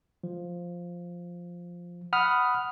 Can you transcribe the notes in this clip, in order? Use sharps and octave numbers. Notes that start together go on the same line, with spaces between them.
F3
F#5 B5 D#6 F6